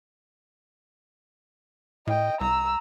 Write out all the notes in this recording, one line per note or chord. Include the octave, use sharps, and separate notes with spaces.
A2 D#5 G5
C2 A#5 E6